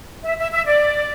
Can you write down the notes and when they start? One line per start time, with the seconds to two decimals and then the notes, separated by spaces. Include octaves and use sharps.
0.24 E5
0.38 E5
0.52 E5
0.66 D5